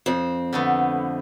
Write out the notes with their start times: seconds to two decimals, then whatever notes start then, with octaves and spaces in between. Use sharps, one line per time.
0.06 F2 C4
0.53 D3 A3 B3